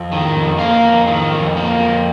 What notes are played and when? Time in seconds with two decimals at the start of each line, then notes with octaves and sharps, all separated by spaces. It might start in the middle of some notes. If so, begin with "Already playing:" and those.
Already playing: F2
0.12 D#3
0.36 F2
0.59 A#3 F5
0.84 F2
1.07 D#3
1.31 F2
1.57 A#3
1.80 F2